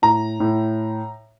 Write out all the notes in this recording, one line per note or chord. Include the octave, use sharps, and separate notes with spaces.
A2 A#5
A2